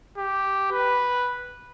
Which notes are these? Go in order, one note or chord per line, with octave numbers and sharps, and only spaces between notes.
G4
B4